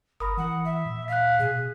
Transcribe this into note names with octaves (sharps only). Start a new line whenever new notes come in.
G1 A#4 B5 D#6
E3 F#5
E5
A#2
F5 F#6 B6
B2 G#4